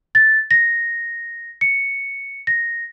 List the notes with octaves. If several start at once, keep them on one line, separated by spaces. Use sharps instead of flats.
A6
A#6
C#7
A#6